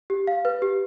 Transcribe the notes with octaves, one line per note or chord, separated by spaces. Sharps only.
G4
F5
B4
G4